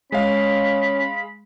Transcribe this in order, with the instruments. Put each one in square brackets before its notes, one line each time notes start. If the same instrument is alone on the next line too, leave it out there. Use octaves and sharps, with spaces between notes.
[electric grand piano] G#3 F5 [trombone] C#4 [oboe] B5